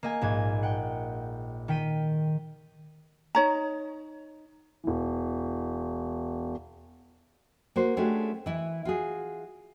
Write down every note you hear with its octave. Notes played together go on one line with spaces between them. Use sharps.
A#3 D#5 G#5
A#1 G#2 G#6
F#5 G5
D#3 G5 B6 D#7
D#4 C#5 A#5
E1 E3
A#3 F#4 C5
G#3 A3 C#4 D4 F#4 G4
E3 E4
F4 F#4 G#4